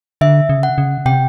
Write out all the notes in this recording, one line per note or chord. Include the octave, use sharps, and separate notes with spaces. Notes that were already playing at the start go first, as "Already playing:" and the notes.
D3 E5
C#3
F#5
C#3
C3 G5